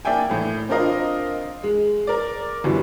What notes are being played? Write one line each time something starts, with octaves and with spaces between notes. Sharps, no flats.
A#3 D5 E5 G5 G#5
A2 E3
C4 D4 F4 A#4 D#5 F5
G#3
A#4 D5
G1 F#2 E3 G3